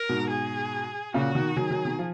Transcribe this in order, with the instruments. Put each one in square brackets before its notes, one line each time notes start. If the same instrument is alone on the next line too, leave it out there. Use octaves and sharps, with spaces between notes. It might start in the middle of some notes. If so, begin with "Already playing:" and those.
Already playing: [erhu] A#4
[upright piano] G#2 B2
[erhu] G#4
[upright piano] A#2 C#3 [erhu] F#4
[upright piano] B2 D#3
[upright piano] D#3 F#3 [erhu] G#4
[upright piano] D#3 F#3
B2 D#3
F3